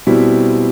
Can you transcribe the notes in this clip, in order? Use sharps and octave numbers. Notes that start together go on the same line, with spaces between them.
B2 G3 C4 E4